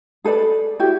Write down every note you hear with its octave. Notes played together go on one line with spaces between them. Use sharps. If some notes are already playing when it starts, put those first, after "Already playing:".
G#4 A4 B4 D5
E4 F#4 G4 G5